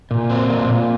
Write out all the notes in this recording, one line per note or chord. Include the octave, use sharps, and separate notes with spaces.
A#2
C4
A#2
A#2